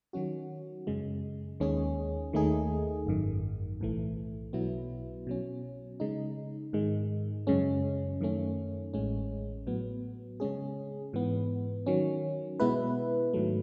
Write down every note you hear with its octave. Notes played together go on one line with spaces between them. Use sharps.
D#3 F#3 C#4 F#4
F#2 C#3 G#3
D#2 D#3 G#3 C#4 G#4
D#2 D#3 A3 D#4 G#4
G#1 F#2 D#3
B1 A2 E3 A3
B1 B2 F#3 B3 E4
B2 F#3 C#4
C#3 G#3 D#4
G#2 D#3 G#3
F#2 C#3 G#3 C#4
F#2 D#3 A3 C#4
A1 A2 G#3 C#4
A2 F#3 B3
C#3 G#3 C#4 G#4
G#2 E3 B3
D#3 F#3 C#4
B2 G#3 B3 E4 B4
G#2 D#3 F#3 A3